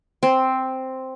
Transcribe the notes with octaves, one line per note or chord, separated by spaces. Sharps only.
C4